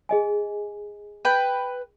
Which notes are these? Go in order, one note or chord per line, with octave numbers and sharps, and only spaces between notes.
G#4 D#5 G#5
B4 G5